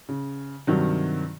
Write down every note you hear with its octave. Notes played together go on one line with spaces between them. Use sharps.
C#3
G2 C3 D#3 F#3